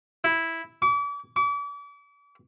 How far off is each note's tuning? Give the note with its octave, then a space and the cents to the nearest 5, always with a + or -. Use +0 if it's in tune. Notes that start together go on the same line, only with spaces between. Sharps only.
E4 -5
D6 -40
D6 -40